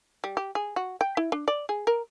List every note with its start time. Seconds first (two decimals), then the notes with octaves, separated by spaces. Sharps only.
0.24 G3
0.37 G4
0.55 G#4
0.76 F#4
1.01 G5
1.17 E4
1.32 D4
1.48 D5
1.69 G#4
1.87 A#4